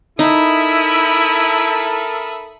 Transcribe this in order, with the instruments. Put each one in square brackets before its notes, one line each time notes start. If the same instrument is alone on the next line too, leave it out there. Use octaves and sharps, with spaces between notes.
[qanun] D#4 [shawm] E4 [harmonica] A4 A#4 [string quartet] E5 B5 D#6